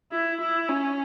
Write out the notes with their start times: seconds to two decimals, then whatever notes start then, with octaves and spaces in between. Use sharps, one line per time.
0.12 E4
0.41 E4
0.69 C#4